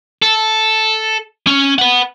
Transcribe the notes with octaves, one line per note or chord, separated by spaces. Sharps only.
A4
C#4
B4 F#5